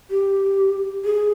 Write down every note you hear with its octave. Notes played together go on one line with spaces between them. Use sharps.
G4
G#4